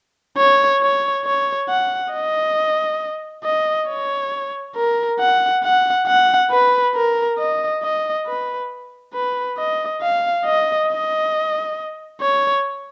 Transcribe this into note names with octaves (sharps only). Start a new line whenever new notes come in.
C#5
C#5
C#5
F#5
D#5
D#5
C#5
A#4
F#5
F#5
F#5
B4
A#4
D#5
D#5
B4
B4
D#5
F5
D#5
D#5
C#5